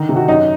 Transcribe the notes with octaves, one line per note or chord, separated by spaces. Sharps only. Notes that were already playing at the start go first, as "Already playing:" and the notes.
Already playing: D3 D#3 D#4
C3
F#4
F#2 D#4